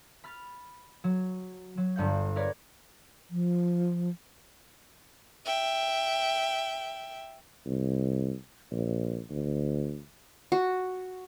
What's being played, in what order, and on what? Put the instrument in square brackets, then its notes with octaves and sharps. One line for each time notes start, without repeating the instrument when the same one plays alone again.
[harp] B5 F6 A6
F#3
F#3
G1 G2 F#5 G6
A#4 B4 C#5 D5 G#6 A#6
[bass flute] F3
[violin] E5 G5
[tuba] C2
A#1
D2
[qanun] F#4